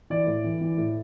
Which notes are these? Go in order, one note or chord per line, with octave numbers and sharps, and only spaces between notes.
E3 D5
A2
E3
E3
A2